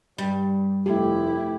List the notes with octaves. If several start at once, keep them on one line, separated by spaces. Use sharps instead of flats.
G2 G3
F1 A3 E4 G4